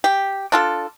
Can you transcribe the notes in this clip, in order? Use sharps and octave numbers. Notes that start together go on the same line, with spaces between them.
G4
D4 F4 A4